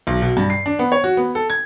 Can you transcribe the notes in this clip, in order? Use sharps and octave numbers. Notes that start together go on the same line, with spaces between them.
B1
B2
G2
C7
D4
B3
C#5
F#4
B3
A4
G#6